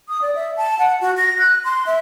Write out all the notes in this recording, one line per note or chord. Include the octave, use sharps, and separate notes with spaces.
D#6
D5
E5
A5
F#5
F#4
A#6
F#6
C6
E5